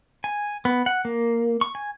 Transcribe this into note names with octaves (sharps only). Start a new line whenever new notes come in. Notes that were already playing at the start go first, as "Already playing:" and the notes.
G#5
B3
F#5
A#3
C#6
G#5